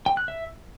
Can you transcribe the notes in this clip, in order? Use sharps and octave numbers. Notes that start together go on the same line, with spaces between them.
G5
F#6
E5